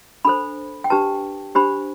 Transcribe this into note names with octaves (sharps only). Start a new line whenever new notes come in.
D4 A4 C5 B5
G5
D4 G4 B4 A5
D4 G4 C5 B5